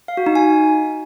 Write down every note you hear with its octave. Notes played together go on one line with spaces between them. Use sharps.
F5
F#4
D#4
G#5